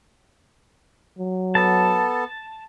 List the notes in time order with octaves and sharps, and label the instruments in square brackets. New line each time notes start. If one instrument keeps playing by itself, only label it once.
[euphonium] F#3
[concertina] B3 A4 [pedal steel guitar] A5